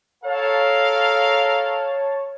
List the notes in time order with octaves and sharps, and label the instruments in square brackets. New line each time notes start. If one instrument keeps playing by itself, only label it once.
[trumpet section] A4 A#4 F5 [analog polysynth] C#5 A5